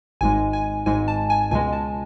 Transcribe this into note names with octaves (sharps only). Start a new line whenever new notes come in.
G#1 G#2 G#3 G#5
G#5
G#1 G#2 G#3 G#5
A5
G#5
C#2 B2 G#3 G#5
A5